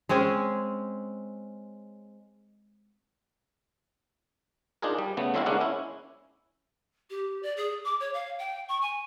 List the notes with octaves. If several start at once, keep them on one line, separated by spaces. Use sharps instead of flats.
G#3 C4 C#4 G#4
D4 D#4 F4 G#4 A#4
G3
C#3 A3 B3
D3 F#3 C4 E4 F#4 F5
G#3 A#3 C#4 D4 E4 F#5
C#4 E4
G4
D5
G#4
D6
C#5
F5
G5
C#6
G#5